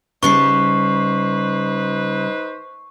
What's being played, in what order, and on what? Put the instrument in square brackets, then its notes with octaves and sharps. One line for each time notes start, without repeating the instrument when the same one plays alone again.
[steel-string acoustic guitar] C#3 G3 A5 [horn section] D#4 B4 C5 [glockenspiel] C#6 C7